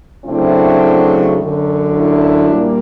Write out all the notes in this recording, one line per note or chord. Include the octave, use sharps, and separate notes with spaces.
C#3 F#3 A3 C4 D4 E4
F#2 D3 F#3
D4 E4
A#2 G3 A#3